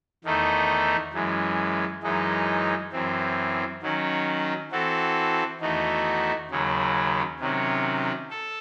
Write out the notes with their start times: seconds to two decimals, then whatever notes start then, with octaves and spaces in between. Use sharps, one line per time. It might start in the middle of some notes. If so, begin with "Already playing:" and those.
0.24 E2 D#3 A3 D#4
1.13 F#2 E3 G#3
2.03 F#2 E3 G#3 D#4
2.92 F#2 E3 C4
3.82 D#3 F#3 C#4
4.71 E3 C4 F#4 A4
5.61 E2 D#3 A3 D#4 F#4
6.51 D#2 C#3 F#3
7.40 C3 D#3 F#3 C#4
8.30 A4